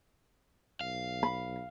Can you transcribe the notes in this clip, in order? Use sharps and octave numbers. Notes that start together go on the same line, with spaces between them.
B1 F5
B5